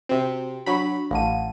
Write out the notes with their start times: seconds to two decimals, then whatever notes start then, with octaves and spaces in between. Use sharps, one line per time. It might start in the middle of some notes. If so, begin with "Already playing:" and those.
0.09 C3 C4 F#4
0.66 F#3 D4 B5 C#6
1.11 A1 F5 F#5 A5 D#7